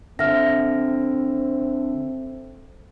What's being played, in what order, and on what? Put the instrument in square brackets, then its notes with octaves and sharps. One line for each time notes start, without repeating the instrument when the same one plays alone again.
[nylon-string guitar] D3 [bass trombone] C4 [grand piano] E5 [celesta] F6 A#6